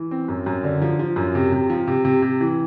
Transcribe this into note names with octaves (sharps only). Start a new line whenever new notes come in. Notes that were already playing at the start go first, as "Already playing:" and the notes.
Already playing: E3
C4
F#2
F#2
D3
F3
F3
F#2
C3
C3
F3
C3
C3
C3
E3